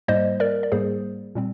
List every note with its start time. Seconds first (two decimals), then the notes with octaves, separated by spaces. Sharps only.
0.08 G#2 G3 A#3 C5 D#5
0.40 A#4 D5
0.63 D5
0.72 G#2 G3 A#3 G#4 C5
1.35 A#2 G3 C4